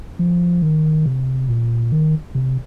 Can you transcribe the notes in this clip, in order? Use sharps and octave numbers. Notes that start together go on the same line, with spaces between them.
F3
D#3
C3
A#2
D#3
C3